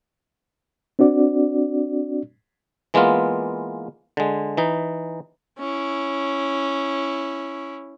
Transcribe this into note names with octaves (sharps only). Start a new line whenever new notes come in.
C4 D4 F#4 D5
E3 G#3 A#3 B3 F4
D3 G#3
E3 D#4
C#4 E4